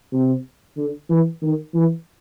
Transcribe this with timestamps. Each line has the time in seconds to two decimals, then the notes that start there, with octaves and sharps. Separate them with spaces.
0.12 C3
0.77 D3
1.09 E3
1.42 D#3
1.74 E3